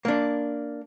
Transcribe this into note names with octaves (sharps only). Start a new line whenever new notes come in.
A#3 D4